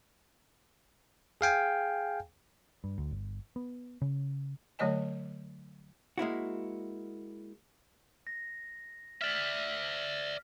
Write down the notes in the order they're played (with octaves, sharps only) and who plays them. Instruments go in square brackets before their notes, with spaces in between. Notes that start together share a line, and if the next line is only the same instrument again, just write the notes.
[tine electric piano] G#4 F5 G5 G#5
[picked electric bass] G2
D2
G1
B3
C#3
[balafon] D3 F#3 A3 C#5 D#5 G#5
[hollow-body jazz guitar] G#3 A#3 E4 F#4
[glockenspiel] A#6
[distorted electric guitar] D5 E5 [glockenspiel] F6 B6